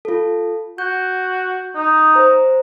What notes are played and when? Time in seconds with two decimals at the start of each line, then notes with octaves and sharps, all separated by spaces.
0.05 F4 A4
0.78 F#4 G6
1.75 D#4
2.14 C5 A#5